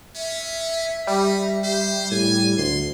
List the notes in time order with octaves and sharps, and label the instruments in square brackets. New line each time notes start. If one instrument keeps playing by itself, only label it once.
[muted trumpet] C#4 [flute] E5
[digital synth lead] G3 [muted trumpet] D#4
[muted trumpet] C5
[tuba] A2 [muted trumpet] G#5
[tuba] D2 [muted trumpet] C6